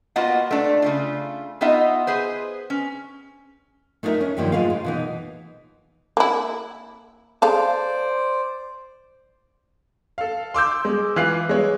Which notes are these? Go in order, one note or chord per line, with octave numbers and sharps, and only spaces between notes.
A#3 B3 F4 F#4 D#5 F#5
A3 D4
C#3 A3 F4
B3 D#4 F4 D#5 E5 F#5
G#4 B4 C5
C#4
A3 D4 D#4 F#4 A#4 E5
C#4
G2 D3 D#3 F3 G3 A#3
G#2 D3 G#3 A3 F4 F5
A2
B2 E3 D#4
A#3 E4
G#4 A4 C5 D5 F5
A4 F5
C6 D6 E6 G6
G#3
E3 F4 F#6 C7
G#3 C#5